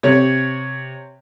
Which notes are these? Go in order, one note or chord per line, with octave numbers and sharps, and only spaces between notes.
C3 C#5